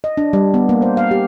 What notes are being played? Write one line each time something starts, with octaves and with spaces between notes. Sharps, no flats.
D#5
D4
G3
B3
A#3
C5
F5
G4